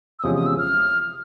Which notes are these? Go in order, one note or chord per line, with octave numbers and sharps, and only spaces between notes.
E6
E2 C3 F3 G#3 C#4 D#6
D#6
E6
F6